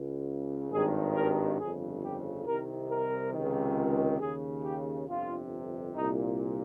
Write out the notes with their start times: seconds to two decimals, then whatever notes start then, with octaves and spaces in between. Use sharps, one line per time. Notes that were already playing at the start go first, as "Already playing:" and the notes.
Already playing: C#2 C#3
0.71 G#1 G2 D#3 G#4
1.15 A#4
1.58 G1 F2 C#3 G#4
2.02 G4
2.45 C2 C3 D#3 A#4
2.89 A#4
3.33 C#2 C3 D#3
4.20 D#2 C#3 G#4
4.64 G4
5.07 G1 F2 C3 F4
5.95 C2 A#2 D#4